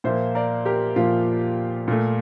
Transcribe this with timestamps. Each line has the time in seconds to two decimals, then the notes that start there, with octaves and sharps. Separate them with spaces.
0.04 A#2 F3 A#3 C5 E5
0.35 A#4 D5
0.65 G4 A#4
0.96 A#2 F3 A#3 F4
1.88 A#2 A3